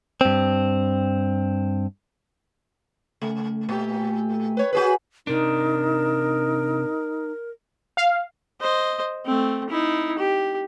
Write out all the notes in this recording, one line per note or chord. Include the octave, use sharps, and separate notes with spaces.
G2 C4
C#3 A3
A#2 G4
B4 C#5
F#4 G#4 B4
C3 D4 D#4 A#4
F5
C5 D#5
A3 C4
D#4 E4
G4